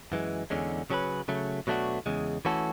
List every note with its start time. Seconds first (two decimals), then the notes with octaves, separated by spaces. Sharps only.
0.12 F#2 E3 G#3
0.50 E2 D3 G#3 C#4
0.90 C#3 F#3 C#4 G#4 B4
1.28 C#3 F#3 A3
1.67 B2 F#3 A3 D4 F#4
2.06 E2 C#3 G#3
2.45 E3 A3 C#4 F#4 A4